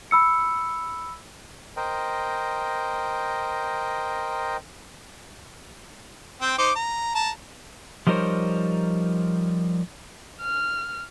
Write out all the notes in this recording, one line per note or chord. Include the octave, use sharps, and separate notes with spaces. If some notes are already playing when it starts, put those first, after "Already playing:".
B5 E6 C#7
A#4 C5 D#5 G5
C4 G5
D#4 C5 D6
A#5
A5 A#5
F3 G3 D#4 A#4 C5 C#5
F6